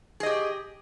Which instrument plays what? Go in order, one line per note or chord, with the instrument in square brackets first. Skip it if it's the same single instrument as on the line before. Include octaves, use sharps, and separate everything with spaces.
[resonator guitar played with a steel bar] G#4
D#5
G4